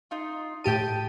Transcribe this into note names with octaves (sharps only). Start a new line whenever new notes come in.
D#4 F4
A2 G4 G5 A5 D#7